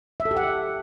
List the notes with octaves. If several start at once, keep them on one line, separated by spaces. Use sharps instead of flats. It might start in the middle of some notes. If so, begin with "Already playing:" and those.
E5
A4
G4
F#5